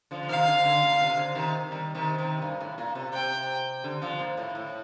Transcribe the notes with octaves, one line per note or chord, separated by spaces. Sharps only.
D3 F3
D3
C3 D#3 F5
D3
D3
A#2
D3
C3
D3
C3 D#3
D#3 G3
C3 D#3
C3 D#3
G2
A2
A#2
C3
C3 G5
D3
D3 F3
A#2
A2
A2